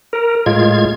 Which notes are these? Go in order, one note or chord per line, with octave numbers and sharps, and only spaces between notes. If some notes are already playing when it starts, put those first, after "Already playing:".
A#4
A2 G#3 F4 G#6